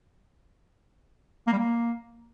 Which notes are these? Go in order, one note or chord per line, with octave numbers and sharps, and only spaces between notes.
A#3
G3
A#3